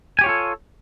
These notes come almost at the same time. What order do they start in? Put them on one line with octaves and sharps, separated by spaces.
G#5 G4 C#5 F4 A4